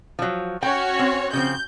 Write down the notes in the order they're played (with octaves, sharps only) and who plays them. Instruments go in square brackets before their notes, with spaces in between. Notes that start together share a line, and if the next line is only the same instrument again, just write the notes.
[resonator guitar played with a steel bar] F3 F#3
[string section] C#4 F#4 C#5 [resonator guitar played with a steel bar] G5
[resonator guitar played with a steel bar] C4
[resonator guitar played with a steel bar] C#3 F3 C4 [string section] G6